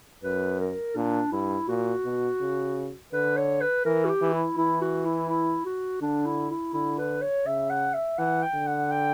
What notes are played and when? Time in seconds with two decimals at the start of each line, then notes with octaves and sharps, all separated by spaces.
0.24 F#2 B4
0.60 A#4
0.96 A#2 D4
1.32 G2 E4
1.68 A#2 F#4
2.04 B2
2.40 C#3
3.13 D3 B4
3.36 C#5
3.61 B4
3.85 E3 A#4
4.05 F#4
4.09 G4
4.21 E3
4.33 E4
4.58 E3 E4
4.82 F#4
5.05 E4
5.29 E4
5.66 F#4
6.01 D3 D4
6.26 E4
6.50 E4
6.74 D3 E4
6.98 B4
7.22 C#5
7.46 C#3 E5
7.70 F#5
7.94 E5
8.18 E3 F#5
8.43 G5
8.54 D3
8.67 F#5
8.91 G5